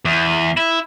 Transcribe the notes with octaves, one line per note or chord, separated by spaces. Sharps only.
E2
E4